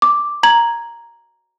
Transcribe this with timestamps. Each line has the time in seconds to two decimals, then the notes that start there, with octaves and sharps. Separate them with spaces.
0.02 D6
0.43 A#5 G#6 F#7